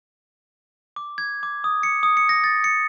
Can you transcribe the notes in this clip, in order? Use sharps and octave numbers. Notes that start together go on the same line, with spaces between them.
D6
G#6
D6
D#6
C#7
D#6
C#7
A#6
A6
C#7